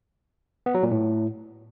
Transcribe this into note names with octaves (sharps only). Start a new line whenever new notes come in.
B3
F#3
A#2
A2